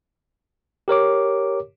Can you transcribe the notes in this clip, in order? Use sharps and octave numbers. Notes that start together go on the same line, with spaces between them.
G4 A#4 C#5 D6